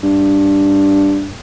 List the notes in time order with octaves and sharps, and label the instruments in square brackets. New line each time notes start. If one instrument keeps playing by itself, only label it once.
[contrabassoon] G2